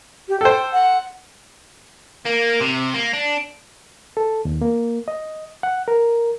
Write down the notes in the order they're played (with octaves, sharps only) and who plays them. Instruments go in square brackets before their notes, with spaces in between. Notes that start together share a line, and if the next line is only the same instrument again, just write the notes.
[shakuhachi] G4
[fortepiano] A4 C5 [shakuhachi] G5
[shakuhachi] F#5
[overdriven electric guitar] A#3
C3
A#3
D4
[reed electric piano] A4
D#2
A#3
D#5
F#5
A#4